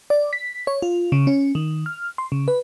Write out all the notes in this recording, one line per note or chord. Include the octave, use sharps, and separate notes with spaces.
D5
B6
C#5
F4
C#3
C#4
D#3
F6
C6
C#3
B4